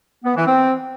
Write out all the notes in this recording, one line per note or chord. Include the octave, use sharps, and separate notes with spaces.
B3
E3
C4